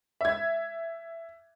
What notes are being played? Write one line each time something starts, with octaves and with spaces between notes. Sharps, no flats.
E5 G#6